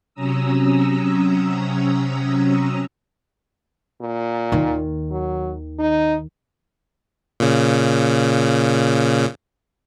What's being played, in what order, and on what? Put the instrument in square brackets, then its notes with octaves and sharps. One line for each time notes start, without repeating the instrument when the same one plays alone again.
[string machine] C3 F#3 C#4 A#5 D#6 E6
[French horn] A#2
[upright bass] D#2 D#3
[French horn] F#3
D#4
[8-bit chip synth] A#2 C#3